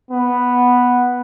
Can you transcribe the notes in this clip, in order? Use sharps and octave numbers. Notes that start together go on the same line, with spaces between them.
B3